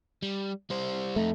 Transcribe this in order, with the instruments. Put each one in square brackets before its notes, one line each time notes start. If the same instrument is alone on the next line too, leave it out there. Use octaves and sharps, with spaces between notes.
[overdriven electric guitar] G3
G3 C5
[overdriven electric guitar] F2 D#4 [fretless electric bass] A3